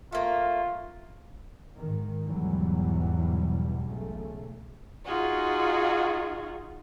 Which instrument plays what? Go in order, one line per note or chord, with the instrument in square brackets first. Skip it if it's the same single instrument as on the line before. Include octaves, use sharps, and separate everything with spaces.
[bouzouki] A3 A#3 [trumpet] F4
[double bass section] G#2 D#3
E2 G#2 B2 E3 F#3 G3
B1 C#3 A3
[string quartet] D#4 F4 F#4 G#4